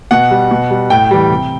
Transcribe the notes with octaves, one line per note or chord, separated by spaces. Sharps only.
B2 F#5
G3
B2
G3
A2 G5
E3 G3
C3